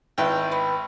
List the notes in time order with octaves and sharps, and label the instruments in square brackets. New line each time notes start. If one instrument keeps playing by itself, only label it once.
[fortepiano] G#1 E4 B4 [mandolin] G5
[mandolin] B3